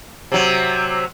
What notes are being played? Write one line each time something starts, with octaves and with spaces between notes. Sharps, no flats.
C3 F#3